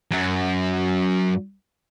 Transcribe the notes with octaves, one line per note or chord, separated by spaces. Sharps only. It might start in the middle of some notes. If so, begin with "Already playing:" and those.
F#2 F#3